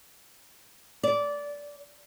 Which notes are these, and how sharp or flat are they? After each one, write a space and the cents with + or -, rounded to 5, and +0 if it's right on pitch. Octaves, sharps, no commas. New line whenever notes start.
D5 -20